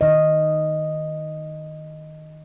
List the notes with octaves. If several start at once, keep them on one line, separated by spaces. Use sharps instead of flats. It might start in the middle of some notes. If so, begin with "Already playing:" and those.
D#3 D#5